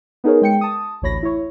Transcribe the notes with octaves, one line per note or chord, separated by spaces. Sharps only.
B3 D#4 G#4 A#4 C#5
G#3 G5 C#7
A5 D#6
A1 D2 C#5 B5 A#6
E4 C#5